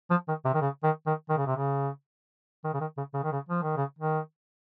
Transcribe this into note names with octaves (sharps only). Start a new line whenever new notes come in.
F3
D#3
C3
D#3
C#3
D#3
D#3
D#3
C#3
C3
C#3
D#3
C#3
D#3
C#3
C#3
D#3
C#3
F3
D#3
C#3
D#3